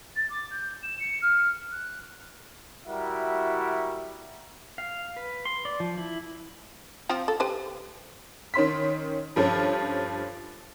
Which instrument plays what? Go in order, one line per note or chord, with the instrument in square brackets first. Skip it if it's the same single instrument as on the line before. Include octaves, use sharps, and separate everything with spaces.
[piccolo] A6
D6
G6
E7
C#7
F6
F#6
[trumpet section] G3 E4 F#4 A#4 E5 F#5
[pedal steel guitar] F5
B4
C6
D5
F3
E4
[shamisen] F3 C4 F4
A4
G4 B4 C5
[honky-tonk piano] D#3 C#4 C6 B6
G2 F3 C#4 A4